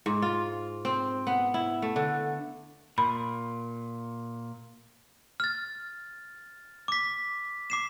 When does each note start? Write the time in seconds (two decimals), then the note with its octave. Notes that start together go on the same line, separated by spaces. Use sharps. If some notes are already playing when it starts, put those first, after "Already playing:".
0.06 G#2
0.22 F4
0.85 C4
1.27 B3
1.54 E4
1.82 A3
1.96 D3
2.98 A#2 B5
5.40 F6 A6
6.88 D6 B6
7.70 D6 C7 E7